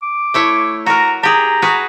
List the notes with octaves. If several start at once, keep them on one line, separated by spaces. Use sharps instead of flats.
D6
A3 E4 C#5
F#4 A#4 A#5
G4 G#4 A#5
F#4 G#4 B4